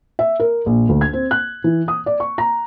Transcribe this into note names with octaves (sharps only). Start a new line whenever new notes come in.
E5
A#4
A#1
D2
G#6
C4
F#6
E3
D#6
D5
C#6
A#5